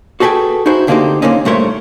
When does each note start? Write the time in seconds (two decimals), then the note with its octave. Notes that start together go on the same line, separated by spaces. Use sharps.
0.20 F#4 G#4 A4 B4 G5 G#5
0.66 D#4 E4 F#4 G#4 C5
0.87 D2 D3 A#3 C4 D#4 G4
1.22 A#2 D3 A#3 C4 C#4 D#4
1.45 G2 A#2 A3 A#4 C5 C#5